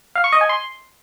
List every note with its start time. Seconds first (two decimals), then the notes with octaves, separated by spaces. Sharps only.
0.15 F5
0.24 C#6
0.32 D#5
0.41 G#5
0.49 C6